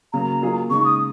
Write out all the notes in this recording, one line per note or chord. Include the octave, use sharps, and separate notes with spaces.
C#3 F#3 A#3 A#5
F#3 A#3 F4 G#4
C#3 G#3 D#4 C#6
D#6